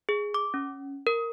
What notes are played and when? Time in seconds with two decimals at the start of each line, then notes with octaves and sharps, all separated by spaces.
0.09 G#4
0.34 D6
0.54 C#4
1.07 A#4